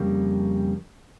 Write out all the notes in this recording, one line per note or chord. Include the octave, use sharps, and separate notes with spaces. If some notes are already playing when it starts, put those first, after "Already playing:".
Already playing: F2 C#3 G3 A#3